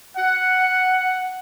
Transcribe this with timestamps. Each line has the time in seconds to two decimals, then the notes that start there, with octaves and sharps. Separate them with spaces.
0.16 F#5